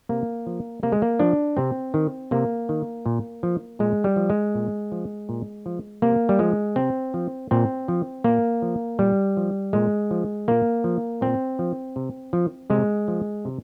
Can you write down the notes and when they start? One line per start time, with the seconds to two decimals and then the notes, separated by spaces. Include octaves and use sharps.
0.09 C3 A#3
0.46 F3
0.83 C3 A#3
0.92 G#3
1.02 A#3
1.19 F3 D4
1.57 C3 C4
1.94 D#3
2.31 C3 A#3
2.69 D#3
3.06 A#2
3.43 F3
3.79 A#2 G#3
4.04 G3
4.16 F3
4.30 G#3
4.55 A#2
4.92 F3
5.29 A#2
5.66 F3
6.02 C3 A#3
6.29 G3
6.39 F3 G#3
6.76 C3 C4
7.14 F3
7.51 A#2 C4
7.88 F3
8.24 A#2 A#3
8.62 F3
8.99 A#2 G3
9.37 F3
9.73 A#2 G#3
10.11 F3
10.48 A#2 A#3
10.84 F3
11.21 A#2 C4
11.59 F3
11.96 C3
12.33 F3
12.70 C3 G#3
13.08 F3
13.45 C3